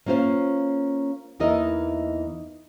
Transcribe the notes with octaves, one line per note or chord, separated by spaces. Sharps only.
A#3 C#4 F4 C5 F5
E2 A#3 D#4 E4 A#4 D#5